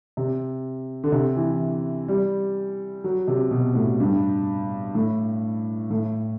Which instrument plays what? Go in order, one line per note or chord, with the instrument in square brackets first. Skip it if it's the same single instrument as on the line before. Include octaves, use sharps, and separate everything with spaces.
[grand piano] C3
D3
C3
E3
G3
F#3
C3
B2
A2
G2
A2
A2